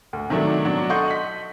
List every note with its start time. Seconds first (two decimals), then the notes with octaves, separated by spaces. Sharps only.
0.13 D2
0.29 C3 D#3 F#3 A3 D4
0.65 B2 F#3 D4
0.89 A4 D#5 F#5 C6 C#6 G6
1.08 B6 F#7